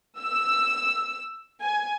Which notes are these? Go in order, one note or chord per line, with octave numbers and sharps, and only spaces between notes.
E6
G#5